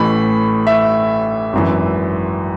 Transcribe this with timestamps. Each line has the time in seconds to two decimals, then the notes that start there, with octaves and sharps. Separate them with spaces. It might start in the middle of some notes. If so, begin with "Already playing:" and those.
Already playing: A1 A2 E3 B5
0.67 E5
1.53 G#1 F#2 E3